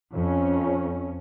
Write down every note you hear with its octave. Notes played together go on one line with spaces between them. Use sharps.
F2 C#4